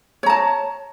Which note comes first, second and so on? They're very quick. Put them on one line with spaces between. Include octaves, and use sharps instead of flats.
C#5 A#5 A5